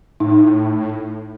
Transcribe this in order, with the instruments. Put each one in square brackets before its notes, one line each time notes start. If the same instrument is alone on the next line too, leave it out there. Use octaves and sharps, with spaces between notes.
[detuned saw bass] A2 [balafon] D#4